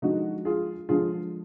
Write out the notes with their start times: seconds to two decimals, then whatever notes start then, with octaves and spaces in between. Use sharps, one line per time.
0.02 D3 F3 G#3 D#4 F#4
0.45 F4 G#4
0.89 D3 F3 G#3 F4 G#4